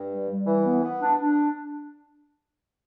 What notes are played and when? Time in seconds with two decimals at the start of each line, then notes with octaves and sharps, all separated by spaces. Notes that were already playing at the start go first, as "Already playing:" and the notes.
Already playing: G2
0.11 G3
0.30 G3
0.47 E3
0.64 B3
0.82 B3
1.01 D4
1.18 D4